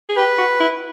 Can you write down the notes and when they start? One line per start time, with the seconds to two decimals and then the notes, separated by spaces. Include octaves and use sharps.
0.09 G#4
0.17 G4 B4
0.38 F#4
0.60 E4